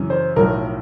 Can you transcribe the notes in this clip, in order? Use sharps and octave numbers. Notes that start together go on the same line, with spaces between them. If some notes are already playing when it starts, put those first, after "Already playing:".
Already playing: F#2 C#3 E3
C5
B1 A2 F3 A#4